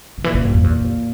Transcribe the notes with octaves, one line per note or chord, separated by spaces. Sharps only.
C#3
A#2 E3
C#3
G2 A#2
F2
E2 A#2
F2 A#2